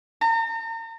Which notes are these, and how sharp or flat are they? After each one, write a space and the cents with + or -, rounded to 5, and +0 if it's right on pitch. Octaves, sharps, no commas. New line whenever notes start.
A#5 -40